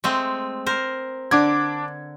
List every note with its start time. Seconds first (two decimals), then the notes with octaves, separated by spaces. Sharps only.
0.04 G#3 A3 C4
0.66 A#4 C5
1.31 D3 D4 D6 G#6